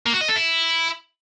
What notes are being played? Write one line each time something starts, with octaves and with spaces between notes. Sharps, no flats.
A#3
F#4
D#5
A4
E4